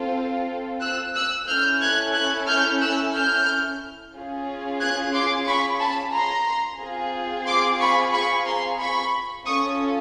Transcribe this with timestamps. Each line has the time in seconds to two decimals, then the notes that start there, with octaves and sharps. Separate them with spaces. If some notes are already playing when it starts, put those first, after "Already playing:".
Already playing: C4 F4 A4
0.81 E6 F#6
1.14 E6 F#6
1.47 C#4 E4 A4 F6 G6
1.81 F#6 G#6
2.14 F#6 G#6
2.47 F6 G6
2.80 E6 F#6
3.14 F6 G6
4.14 C#4 F4 G#4
4.80 F#6 G#6
5.13 C6 D6
5.46 B5 C#6
5.80 A5 B5
6.13 A#5 C6
6.79 C4 F4 G#4
7.46 C6 D6
7.79 B5 C#6
8.12 B5 C#6
8.46 A#5 C6
8.80 B5 C#6
9.45 C#4 F4 A4 C#6 D#6